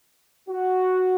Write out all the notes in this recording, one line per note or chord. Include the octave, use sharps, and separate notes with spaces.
F#4